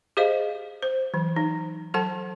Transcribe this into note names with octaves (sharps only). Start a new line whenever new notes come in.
G4 G#4 C5 D#5 F5
C5
E3 F#3
D#4
F#3 A4 F#5 A5